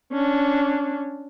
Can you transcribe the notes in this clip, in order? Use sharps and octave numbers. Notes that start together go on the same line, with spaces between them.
C#4 D4